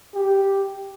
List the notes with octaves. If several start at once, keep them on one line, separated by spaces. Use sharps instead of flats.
G4